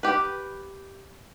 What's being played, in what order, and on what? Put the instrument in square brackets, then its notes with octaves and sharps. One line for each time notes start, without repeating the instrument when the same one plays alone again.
[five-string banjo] G4 B4